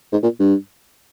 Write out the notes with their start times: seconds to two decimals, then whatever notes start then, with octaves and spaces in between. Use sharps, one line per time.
0.12 G#2
0.23 A#2
0.39 G2